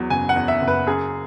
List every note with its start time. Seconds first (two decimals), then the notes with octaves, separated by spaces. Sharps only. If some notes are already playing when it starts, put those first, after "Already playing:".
Already playing: E2 F#3
0.10 F#1 G#5
0.29 F#5
0.36 E2
0.48 E5
0.61 F#1
0.68 B4
0.87 F#2 G#4